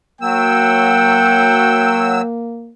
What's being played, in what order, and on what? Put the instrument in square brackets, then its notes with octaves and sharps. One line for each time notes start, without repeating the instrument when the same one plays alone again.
[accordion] F#3 E6 [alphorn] A#3 [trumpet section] F#5 G5